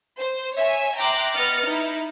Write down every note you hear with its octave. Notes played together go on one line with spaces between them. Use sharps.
C5
C#5 E5 G#5
E5 G5 A#5 C6 D6 F#6
B3 D#5 F6 A6 C#7
D#4 E4